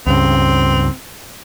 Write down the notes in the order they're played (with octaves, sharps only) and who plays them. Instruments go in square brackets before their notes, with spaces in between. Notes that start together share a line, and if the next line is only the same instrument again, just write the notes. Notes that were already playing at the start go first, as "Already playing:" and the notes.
[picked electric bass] C#2 G2 C#3 [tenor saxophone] C4